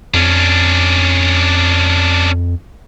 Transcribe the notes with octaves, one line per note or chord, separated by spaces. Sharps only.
F2 C#4 D4